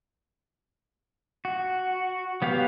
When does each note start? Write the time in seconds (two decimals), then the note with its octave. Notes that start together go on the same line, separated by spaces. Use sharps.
1.45 F#4
2.42 F#3 B3 G4 F5